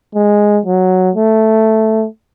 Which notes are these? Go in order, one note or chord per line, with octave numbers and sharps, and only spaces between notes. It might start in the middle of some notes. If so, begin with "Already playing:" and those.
G#3
F#3
A3